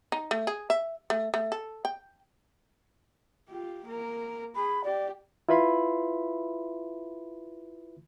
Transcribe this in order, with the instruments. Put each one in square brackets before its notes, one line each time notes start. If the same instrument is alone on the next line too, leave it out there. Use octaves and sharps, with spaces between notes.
[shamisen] D#4
A3
G#4
E5
A3
A3
A4
G5
[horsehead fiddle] F4 G4
A#3 A#4
[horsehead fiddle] G#4 [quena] B5
[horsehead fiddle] G4 [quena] D5
[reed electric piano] E4 F4 B4 E5 B5 C6